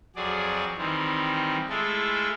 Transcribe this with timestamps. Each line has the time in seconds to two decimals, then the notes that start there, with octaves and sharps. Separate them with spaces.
0.16 F2 F#3 G#4 D5
0.78 D#3 E3 G3 C4
1.69 G#3 A3 E4 F4 A4